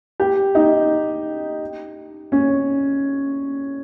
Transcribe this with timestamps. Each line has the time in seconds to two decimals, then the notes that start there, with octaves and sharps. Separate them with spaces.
0.20 G4
0.55 D#4
2.32 C#4